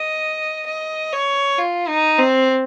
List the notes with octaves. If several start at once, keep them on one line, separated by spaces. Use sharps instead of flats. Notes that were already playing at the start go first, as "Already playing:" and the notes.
Already playing: D#5
D#5
C#5
F4
D#4
C4